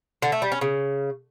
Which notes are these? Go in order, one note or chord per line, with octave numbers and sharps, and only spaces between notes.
D3
A3
G3
C#4
C#3